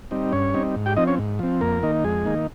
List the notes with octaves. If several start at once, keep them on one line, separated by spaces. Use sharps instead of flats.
G3 C4 D#4
G2 C#4 C#5
G3 C4 D#4
G#2
G4 G5
F3 C4 D#4 D#5
C#4 C#5
G#2
F3 C4
F2 A#3 A#4
D#3 A#3 D#4
F2 G#3 G#4
D#3 A#3 D#4